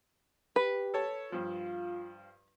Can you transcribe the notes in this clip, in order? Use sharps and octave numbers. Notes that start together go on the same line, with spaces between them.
G4 B4
A4 C#5 A5
G2 F3 F4